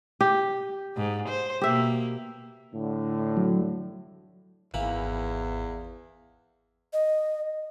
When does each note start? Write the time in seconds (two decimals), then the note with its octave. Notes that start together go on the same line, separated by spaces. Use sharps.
0.21 G4
0.97 G#2
1.28 C5
1.61 B2 A#3 G4 E5
2.73 A2 D3
3.37 F#3
4.74 G#1 E2 E3 A#3 B5
6.93 D#5